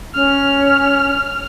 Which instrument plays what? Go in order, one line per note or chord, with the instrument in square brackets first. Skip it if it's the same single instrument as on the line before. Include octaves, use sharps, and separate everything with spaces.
[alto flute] C#4 [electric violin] F6